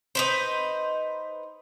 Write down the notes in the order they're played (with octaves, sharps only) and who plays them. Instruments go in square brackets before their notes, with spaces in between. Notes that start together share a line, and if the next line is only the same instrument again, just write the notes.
[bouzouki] D#4 B4 C5